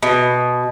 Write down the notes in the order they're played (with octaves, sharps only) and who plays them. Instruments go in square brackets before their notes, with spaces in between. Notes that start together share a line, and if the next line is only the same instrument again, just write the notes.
[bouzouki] B2